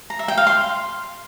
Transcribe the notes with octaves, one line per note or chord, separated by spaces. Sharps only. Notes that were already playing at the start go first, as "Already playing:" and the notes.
A#5
E5
G5
F5
C6